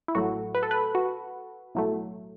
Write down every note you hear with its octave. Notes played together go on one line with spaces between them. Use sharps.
E4
A1 A2 F#3 A3 F#4
B4
A4
B4
F#4
B1 A2 F#3 A3